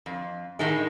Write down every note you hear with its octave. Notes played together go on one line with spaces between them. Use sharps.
F2
A2 D#3 G#3